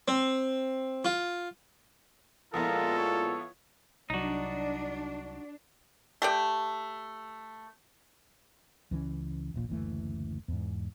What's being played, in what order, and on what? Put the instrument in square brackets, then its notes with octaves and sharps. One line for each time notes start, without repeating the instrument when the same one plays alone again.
[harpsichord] C4
F4
[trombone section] A#2 G#3 F4 [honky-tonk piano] F3 B3 E4 [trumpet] A4 [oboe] A#4
[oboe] C#5
[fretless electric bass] C2 F#3 [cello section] D4 [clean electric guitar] D#4 F#4
[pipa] A3 G4 D5
[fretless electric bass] C#2 E3 F3 C#4
D#1 A#1 A#2
F#1 D2 E3 A3
E2 G#2